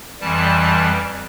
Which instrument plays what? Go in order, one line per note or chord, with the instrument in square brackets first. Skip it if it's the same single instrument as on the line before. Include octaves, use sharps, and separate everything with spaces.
[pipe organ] F2 E3 G3 A5